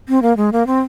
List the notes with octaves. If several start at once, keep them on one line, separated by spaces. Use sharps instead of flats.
C4
A#3
G#3
A#3
C4